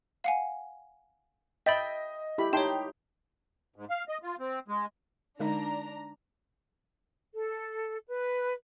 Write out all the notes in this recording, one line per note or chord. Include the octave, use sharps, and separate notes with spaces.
F5 F#5 G#5
D#5 E5 G5 B5 A6 B6
E4 G4 B5
D#4 G4 C#5 G5 A5 C6
G#2
F5
D#5
F4
C4
G#3
D3 G#3 D4 D#4 A#5
A4
B4